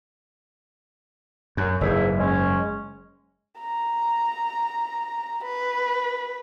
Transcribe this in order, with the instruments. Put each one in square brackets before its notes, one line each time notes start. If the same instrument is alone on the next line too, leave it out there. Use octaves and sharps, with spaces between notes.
[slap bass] F#2
[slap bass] F#1 G#2 [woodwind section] E3 G#4 E5
[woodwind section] G#3 C#4
[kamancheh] A#5
B4